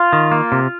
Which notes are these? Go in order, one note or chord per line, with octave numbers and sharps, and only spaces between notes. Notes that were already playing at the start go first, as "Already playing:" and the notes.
Already playing: F4
D#3
A#3
C3